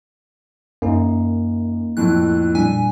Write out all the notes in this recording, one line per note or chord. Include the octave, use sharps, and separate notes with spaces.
F#2 A#3 D#4
F2 A2 F#6
A#2 G3 D4 G#5